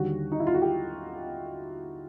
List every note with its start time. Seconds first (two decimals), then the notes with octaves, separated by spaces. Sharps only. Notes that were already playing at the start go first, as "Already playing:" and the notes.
Already playing: D#2 D3 G3 F#4
0.32 D#4
0.40 E4
0.47 F4
0.54 F#4
0.62 G4